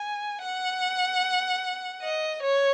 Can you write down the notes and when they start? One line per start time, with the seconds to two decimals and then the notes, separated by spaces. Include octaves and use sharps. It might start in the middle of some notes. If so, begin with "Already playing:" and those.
Already playing: G#5
0.42 F#5
2.02 D#5
2.43 C#5